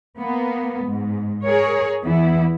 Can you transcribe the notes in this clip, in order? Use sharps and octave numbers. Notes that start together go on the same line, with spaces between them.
A#3 B3
G#2
G#4 A#4 C#5
E2 E3 B3 E4